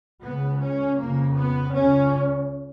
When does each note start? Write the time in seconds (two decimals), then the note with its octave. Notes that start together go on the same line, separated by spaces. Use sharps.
0.23 C#2 C#3 B3
0.61 C#4
0.99 F2 C#3 A#3
1.36 B3
1.74 C#2 C#3 C#4